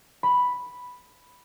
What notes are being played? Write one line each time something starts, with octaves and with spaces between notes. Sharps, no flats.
B5